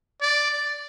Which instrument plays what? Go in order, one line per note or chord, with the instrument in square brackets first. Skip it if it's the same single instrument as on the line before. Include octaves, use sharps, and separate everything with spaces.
[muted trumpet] D5